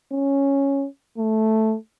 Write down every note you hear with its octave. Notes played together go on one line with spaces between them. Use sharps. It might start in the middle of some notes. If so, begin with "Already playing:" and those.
C#4
A3